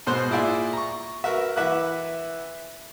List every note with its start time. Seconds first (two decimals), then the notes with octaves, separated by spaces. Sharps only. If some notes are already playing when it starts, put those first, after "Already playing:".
0.07 G#2 B2 C5 C6 F#6
0.30 A#2 E4 G#4 D5 E5
0.73 A#5 C#6
1.24 F#4 A#4 B4 E5
1.56 E3 B4 E5 F#5 D6 F#6